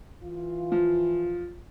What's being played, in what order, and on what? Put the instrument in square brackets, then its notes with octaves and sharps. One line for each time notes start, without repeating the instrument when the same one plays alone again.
[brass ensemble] E3 F4
[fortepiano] F3